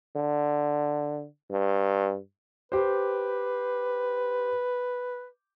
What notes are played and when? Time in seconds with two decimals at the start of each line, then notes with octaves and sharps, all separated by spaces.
0.16 D3
1.52 G2
2.72 G4 B4 C5